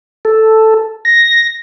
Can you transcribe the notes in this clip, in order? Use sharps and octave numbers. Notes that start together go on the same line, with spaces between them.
A4
A#6